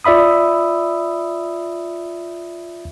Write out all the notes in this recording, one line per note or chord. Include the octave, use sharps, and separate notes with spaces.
F4 D5 E5 B5 D#6